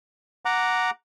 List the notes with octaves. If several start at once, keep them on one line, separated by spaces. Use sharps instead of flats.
F#5 A#5 D6